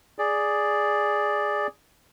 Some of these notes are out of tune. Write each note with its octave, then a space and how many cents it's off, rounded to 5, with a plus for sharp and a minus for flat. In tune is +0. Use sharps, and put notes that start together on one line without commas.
G#4 +0 D5 +0